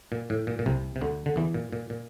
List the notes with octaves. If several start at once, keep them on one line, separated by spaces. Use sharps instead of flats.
A#2
A2
A#2
A#2
C2 C3
C3
D2 D3
D3
E2 E3
A#2
A#2
A#2